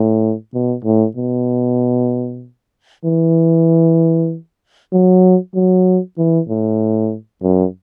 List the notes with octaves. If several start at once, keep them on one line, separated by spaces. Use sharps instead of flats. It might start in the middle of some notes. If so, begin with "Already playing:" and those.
Already playing: A2
B2
A2
B2
E3
F#3
F#3
E3
A2
F#2